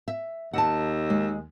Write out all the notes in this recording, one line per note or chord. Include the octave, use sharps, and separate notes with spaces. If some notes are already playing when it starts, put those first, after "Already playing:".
E5
D#2 F#5 A5
G#3